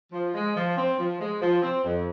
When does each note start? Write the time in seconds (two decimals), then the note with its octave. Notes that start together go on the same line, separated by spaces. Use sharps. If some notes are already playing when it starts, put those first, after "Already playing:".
0.12 F3
0.34 G#3
0.56 F3
0.77 C4
0.99 F3
1.20 G#3
1.41 F3
1.63 C4
1.84 F2